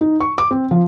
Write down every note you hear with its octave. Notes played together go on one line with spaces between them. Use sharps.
D#4
C#6
D6
C4
F3